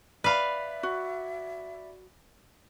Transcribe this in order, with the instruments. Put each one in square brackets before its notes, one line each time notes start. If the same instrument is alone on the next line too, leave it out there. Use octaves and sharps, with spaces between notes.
[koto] B4 F5 [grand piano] D5 B5 [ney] E5
[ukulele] F#4